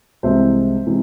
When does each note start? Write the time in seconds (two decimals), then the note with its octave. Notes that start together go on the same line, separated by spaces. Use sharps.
0.23 C2 C3 E3 G#3 C5 E5
0.86 C3 E3 G#3